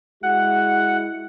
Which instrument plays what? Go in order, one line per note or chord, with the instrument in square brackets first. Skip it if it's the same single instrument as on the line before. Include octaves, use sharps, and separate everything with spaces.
[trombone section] G#3 E4 F#4 [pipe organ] F#5